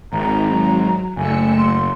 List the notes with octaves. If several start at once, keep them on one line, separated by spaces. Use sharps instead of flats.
G#1 D#3 A#5
F#3
F#1 A3 G#5 E6 C#7
C6